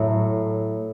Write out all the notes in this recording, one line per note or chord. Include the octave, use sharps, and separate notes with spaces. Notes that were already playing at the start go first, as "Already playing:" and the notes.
Already playing: A2 F#3 A3